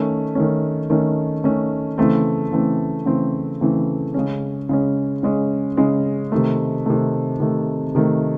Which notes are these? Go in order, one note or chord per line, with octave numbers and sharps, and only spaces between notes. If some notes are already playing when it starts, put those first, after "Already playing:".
Already playing: D#3 A3 C#4
D#3 A3 C#4
D#3 A3 C#4
D#3 A3 C#4
C#3 E3 A3 C4
C#3 E3 A3 C4
C#3 E3 A3 C4
C#3 E3 A3 C4
C#3 G#3 C#4
C#3 G#3 C#4
C#3 G#3 C#4
C#3 G#3 C#4
C3 D#3 A3
C3 D#3 A3
C3 D#3 A3
C3 D#3 A3